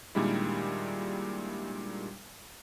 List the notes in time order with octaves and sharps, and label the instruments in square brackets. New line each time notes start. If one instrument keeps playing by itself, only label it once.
[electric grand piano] A#2 D#3 G3 G#3 D4 E4